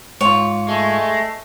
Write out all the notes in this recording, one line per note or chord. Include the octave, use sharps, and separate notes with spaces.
G#2 F4 C#5
G#3 A3